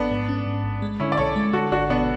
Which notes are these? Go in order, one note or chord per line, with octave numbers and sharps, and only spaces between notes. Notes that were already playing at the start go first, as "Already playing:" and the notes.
Already playing: A1 B3 D4
G#2
C#4
G#2
A1
G#3
D3 C#4 E4
D5
B1 A4 C#5
G#3
D3 F#4 A4
G#1 D4 F#4
B2 B3 D4